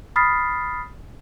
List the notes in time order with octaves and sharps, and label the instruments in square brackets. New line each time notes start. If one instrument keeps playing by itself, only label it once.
[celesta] B5 D#6 F6 A6 B6 C7